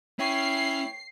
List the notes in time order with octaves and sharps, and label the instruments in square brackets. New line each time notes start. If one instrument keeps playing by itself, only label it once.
[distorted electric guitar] C#4 [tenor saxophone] E4 [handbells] C#5 G5 C#6 [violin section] C7